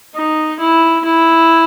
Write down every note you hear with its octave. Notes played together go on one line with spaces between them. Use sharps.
D#4
E4
E4